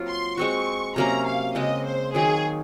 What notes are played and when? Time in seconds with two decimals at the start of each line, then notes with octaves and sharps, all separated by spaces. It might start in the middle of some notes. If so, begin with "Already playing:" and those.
Already playing: F#3 A#3 C4 F4
0.08 C6
0.37 G#3 C4 F#4 C#6
0.96 C3 F#3 A#3 C#4 A#5
1.26 F5
1.55 C#3 G#3 C4 D#5
1.85 C5
2.14 D#3 F#3 A#3 G#4